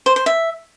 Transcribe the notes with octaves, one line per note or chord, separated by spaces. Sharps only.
C5
C5
E5